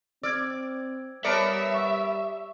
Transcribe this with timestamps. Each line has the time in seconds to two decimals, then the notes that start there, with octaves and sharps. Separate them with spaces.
0.23 C4 D5 E6 F6 G#6
1.24 G3 B3 A#4 C#5 D5 E5 A5 C#7
1.74 C#6 E6